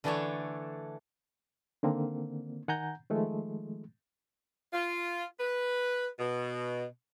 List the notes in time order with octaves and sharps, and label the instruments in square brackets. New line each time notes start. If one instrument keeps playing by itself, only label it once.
[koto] D3 E3 A3 D4 A4 C#5
[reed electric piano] D3 D#3 A#3 C4 D4
D#3 F#5 G#5 A#5 G6
D#3 F3 G#3 A3
[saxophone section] F4
B4
B2